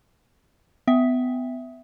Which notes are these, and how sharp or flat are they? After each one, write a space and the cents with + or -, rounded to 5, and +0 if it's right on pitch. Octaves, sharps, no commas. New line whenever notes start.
B3 +30 E5 +0 G5 +35